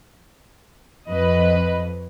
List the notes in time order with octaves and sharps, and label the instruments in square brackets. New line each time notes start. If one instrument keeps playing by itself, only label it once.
[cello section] F2 [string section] B4 D#5